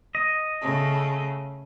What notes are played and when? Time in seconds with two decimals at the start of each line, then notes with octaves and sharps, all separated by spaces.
0.15 D#5
0.60 C#3 A3